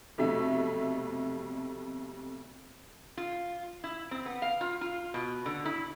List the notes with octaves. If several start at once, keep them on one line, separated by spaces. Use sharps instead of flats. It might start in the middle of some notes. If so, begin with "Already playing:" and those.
B1 F2 C3 A3 E5
F4
E4
C4
B3
F5
F4
F4
B2
D3
E4